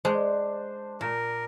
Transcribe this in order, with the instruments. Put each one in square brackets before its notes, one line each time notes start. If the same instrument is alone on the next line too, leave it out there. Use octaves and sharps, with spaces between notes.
[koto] G#3 [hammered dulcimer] D4 [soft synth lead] C5
[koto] A#2 [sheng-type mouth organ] A#4